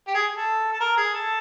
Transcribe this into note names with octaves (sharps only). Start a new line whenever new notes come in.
G4
G#4
A4
A4
A#4
G#4
A4